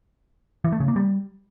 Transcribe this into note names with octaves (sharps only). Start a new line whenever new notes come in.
E3
A3
C#3
A#3
G3